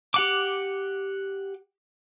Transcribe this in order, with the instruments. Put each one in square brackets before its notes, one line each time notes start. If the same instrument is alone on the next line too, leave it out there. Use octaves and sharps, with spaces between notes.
[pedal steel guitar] G4 F#5 D6